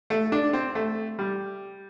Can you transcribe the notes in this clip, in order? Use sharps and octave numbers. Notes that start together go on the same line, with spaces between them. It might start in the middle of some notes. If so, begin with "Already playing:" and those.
A3
D4
C4
A3
G3